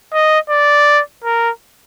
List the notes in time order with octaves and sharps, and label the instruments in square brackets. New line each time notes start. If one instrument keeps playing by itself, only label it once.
[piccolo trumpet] D#5
D5
A#4